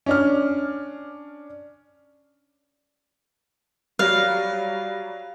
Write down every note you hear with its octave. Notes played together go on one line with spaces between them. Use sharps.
C#4 D4 F6
F#3 G3 F5